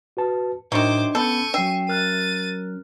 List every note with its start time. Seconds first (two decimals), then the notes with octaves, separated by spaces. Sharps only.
0.17 F#4 B4 A5
0.72 A2 D#3 F#3 D4 C5 E5 D6
1.15 B3 C#4 A4 B5 C#6 G6 D#7
1.54 F#3 C#4 E5 G5 C7
1.89 A#4 F6 F#6 A6 D#7